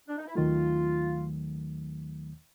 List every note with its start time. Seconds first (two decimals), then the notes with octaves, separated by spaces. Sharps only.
0.08 D4
0.18 D#4
0.27 E4
0.35 D#2 D#3 F#3 A3 F4